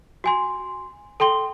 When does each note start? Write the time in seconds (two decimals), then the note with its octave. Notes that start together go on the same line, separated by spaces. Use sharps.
0.24 F#4 G#5 C6
1.20 A4 G5 C6 G7